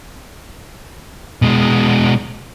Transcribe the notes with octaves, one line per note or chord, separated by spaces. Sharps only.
B2 G#3